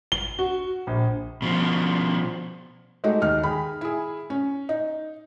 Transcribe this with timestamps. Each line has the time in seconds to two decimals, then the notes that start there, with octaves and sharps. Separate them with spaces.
0.12 G7
0.39 F#4
0.87 A#1
1.42 B2 F3
3.04 G#3 A3 D#4 F#4 G4
3.22 D#2 D#4 F6
3.43 D#3 G#4 B5
3.81 E4 G#4
4.30 C#4
4.69 D#4